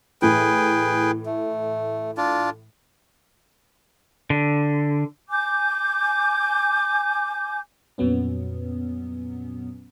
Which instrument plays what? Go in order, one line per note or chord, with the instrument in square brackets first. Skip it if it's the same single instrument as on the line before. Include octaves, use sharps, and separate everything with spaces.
[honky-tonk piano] A2 E3 [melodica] G#4 B4 G5
[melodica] A3
D4 F4
[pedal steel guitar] D3
[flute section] G#5 D6 G6
[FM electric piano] F2 A#2 F#3 B3 C#4